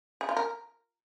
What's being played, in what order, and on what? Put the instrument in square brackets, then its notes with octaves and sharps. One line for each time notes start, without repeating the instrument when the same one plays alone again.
[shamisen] G#4
F4
A#4